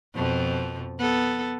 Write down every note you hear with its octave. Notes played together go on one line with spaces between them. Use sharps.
F2 B2 F3
B3 A4